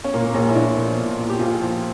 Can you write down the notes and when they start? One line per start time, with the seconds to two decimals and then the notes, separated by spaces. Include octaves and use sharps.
0.04 C#4
0.14 A#2 A#3
0.26 A#3
0.34 A#1 C#4
0.49 E4
0.55 A#1 D4
0.76 F3
0.98 A#2
1.19 A#1
1.30 G4
1.39 A#1 F4
1.61 F3